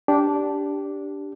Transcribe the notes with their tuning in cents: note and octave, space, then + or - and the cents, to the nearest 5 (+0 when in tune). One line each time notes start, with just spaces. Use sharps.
D4 -10 G4 +0